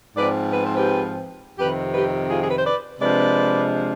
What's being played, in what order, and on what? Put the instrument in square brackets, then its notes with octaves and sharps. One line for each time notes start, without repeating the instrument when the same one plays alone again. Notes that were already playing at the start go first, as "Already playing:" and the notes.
[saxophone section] G#2 F3 C4 B4 D5
B4
C5
G4 B4
F2 C3 D#3 G4 B4
G4 B4
F4 G#4
G#4
B4
C5
B4 D5
C3 F3 G#3 D4 B4 D5